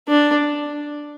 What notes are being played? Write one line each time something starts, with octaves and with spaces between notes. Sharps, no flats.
D4